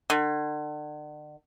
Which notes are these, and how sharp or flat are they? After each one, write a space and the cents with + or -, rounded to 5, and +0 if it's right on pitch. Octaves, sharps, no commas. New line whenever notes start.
D3 +40